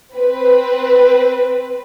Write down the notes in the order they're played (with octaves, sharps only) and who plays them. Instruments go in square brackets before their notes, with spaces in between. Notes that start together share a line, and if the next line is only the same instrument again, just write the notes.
[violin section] C4 B4